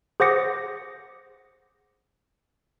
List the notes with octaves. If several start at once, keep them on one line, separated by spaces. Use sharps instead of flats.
G#4 C5 F#5 D6 A#6 C#7